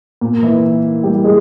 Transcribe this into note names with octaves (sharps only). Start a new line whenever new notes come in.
A#2
E3 E4
G3 G4
G#3 G#4